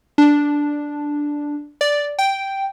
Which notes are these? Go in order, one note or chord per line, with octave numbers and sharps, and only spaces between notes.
D4
D5
G5